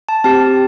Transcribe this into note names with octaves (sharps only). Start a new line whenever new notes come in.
A5
C4 G4 A5